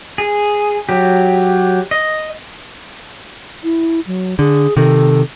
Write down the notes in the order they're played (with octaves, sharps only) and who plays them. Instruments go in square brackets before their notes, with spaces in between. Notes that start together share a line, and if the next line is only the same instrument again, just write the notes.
[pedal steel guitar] G#4
F#3 G4
D#5
[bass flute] E4
F#3
[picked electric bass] D3 [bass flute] G#4
[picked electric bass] C3 D#3 [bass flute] A4